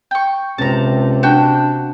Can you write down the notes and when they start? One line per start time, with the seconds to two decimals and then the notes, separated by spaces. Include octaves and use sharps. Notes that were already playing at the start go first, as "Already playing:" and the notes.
0.11 G5 C#6
0.58 C#2 C3 A5 A#5
1.23 D4 F#4 G5